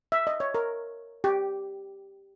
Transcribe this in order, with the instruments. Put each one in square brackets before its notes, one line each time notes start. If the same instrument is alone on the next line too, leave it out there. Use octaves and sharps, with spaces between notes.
[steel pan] E5
D#5
C#5
A#4
G4